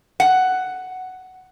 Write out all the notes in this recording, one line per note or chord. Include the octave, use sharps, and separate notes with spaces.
F#5